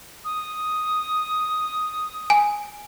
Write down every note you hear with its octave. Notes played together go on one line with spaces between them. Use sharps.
D#6
G#5